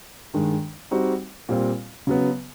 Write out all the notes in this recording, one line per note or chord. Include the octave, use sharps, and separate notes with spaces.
G2 D#3 G#3
G3 C4 D#4 F#4
A#2 G3 C4 F4
C#3 F#3 B3